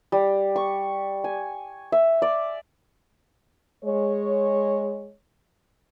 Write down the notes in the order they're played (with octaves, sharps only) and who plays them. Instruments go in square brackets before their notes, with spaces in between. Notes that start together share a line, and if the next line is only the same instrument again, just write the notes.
[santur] G3
C#6
G#5
E5
D5
[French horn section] G#3 C#5